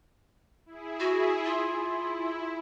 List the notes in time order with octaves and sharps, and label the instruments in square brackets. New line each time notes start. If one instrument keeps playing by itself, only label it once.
[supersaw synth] E4 G#4
[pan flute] F#4
F4
[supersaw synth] E4